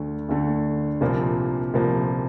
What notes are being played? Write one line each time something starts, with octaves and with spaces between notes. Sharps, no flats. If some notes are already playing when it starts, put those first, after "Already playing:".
Already playing: D2 D3 A3
D2 D3 A3
C2 A#2 F3 A#3
C2 A#2 F3 A#3